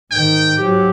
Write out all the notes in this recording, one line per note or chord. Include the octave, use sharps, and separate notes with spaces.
G#2 D#3 G5
G#2 F#3 G4